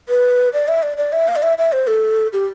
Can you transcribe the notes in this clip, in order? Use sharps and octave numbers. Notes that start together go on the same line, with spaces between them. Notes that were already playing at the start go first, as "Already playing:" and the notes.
B4
D5
E5
D5
D5
E5
F5
D5
E5
E5
C5
A4
G4